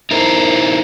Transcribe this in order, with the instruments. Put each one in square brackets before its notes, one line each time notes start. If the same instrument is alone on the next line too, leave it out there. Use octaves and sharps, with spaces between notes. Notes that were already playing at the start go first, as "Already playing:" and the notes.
[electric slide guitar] D#4 E4 A#4 C5